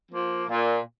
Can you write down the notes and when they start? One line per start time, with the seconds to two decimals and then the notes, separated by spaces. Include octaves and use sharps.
0.11 F3 A#3
0.49 A#2